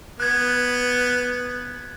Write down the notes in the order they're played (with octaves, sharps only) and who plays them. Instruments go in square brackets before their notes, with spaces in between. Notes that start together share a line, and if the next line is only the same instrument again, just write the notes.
[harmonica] B3 [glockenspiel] F#6 G#6